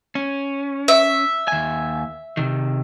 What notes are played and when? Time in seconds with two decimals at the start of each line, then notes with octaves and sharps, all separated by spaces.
0.15 C#4
0.88 E5
1.48 D#2 G#5
2.37 C3 D#3